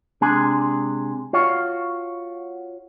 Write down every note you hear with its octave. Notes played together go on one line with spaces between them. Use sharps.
C3 G#3 D4 G#4 G#5
F4 F#4 C#5